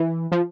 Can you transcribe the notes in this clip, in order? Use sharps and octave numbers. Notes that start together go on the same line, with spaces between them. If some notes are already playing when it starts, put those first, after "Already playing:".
Already playing: E3
F3